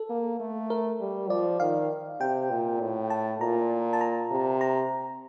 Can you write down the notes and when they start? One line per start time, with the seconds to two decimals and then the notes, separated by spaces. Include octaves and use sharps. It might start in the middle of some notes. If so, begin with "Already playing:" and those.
Already playing: A4
0.09 A#3
0.40 A3
0.70 A#4
1.00 G3
1.30 F3 D5
1.60 D#3 F5
2.20 C3 G5
2.50 A#2
2.80 A2
3.10 A5
3.40 A#2 A#5
3.93 A5
4.01 A#5
4.31 C3
4.61 A#5